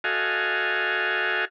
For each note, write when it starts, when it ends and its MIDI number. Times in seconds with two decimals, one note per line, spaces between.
0.04 1.45 66
0.04 1.45 69
0.04 1.45 75
0.04 1.45 77
0.04 1.45 80